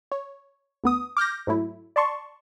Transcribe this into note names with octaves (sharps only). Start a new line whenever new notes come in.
C#5
D2 B3 D#6
D6 F6 G6 A#6
G#2 F#3 A3 E4
D5 A5 C6 C#6